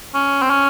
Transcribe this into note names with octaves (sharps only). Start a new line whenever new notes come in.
C#4
C4
C#4